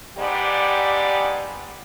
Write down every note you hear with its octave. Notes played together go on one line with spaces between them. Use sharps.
G#2 B3 G4 D5